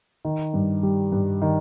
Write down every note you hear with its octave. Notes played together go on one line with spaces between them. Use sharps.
D#3
G2
G3
G2
D#3